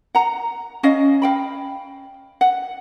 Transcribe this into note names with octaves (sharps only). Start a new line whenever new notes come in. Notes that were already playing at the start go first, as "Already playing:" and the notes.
F#5 A#5
C#4 D#5 F5
F5 G5 B5
F#5